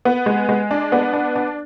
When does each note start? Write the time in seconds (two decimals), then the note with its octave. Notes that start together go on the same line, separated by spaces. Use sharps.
0.05 B3
0.26 G#3
0.49 G#3
0.71 D4
0.92 B3
1.13 D4
1.36 D4